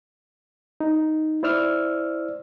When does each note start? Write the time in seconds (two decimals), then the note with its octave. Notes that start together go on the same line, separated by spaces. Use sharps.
0.80 D#4
1.43 E4 C5 D5 E6 F6